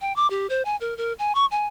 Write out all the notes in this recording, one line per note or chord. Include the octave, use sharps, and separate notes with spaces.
G5
D6
G4
C5
G#5
A#4
A#4
G#5
C#6
G#5